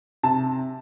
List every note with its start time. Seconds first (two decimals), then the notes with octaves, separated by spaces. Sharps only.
0.23 C3 A5